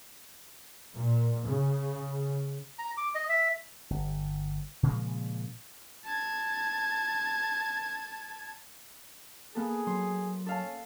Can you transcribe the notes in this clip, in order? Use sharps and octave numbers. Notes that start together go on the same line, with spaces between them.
A#2
C#3
A#5
D6
D#5
E5
G1
A#2 C#3 F3 G#3
A5 G#6
A#3 B3 G#4 A4
F#3 C6
C#4 A4 F5 A5